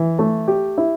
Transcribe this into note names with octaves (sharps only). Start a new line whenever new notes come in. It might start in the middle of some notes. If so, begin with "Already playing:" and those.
Already playing: E3
A3
G4
E4